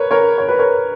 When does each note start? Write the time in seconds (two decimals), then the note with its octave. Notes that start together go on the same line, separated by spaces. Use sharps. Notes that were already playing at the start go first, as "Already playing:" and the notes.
Already playing: A#4 B4 C#5
0.11 A#4 C#5
0.38 C#5
0.49 B4
0.59 A#4 C#5